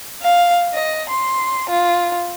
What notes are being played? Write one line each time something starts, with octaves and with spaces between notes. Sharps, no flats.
F5
D#5
C6
F4